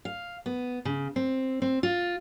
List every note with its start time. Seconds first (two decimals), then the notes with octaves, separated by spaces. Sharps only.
0.05 F5
0.46 B3
0.85 C#3
1.16 C4
1.62 C4
1.83 F4